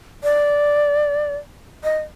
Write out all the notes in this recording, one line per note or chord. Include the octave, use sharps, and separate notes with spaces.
D5
D#5